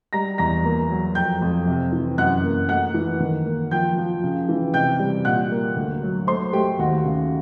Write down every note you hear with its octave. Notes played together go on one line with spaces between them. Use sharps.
G3 A#5 A#6
E2 A#5 A#6
A#3
F#3
F2 G5 G6
F2
C3
E3
F#2 F#5 F#6
A#3
A3 F#5 F#6
E3
D#3
A#3
F3 G5 G6
F3
C#3
E3
C3 G5 G6
G3
A#2 F#5 F#6
A#3
D2
F#3
A3 C5 C6
A3 G4 G5
D#2 F#4 F#5
C#3